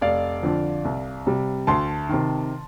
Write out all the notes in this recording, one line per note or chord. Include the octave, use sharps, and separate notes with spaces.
F1 D5 F5
F2 D3 F3
C2
C3 G3
D2 A5 C6
C3 D#3